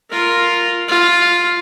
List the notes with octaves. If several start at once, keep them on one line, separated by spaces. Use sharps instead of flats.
F4 A#4
F4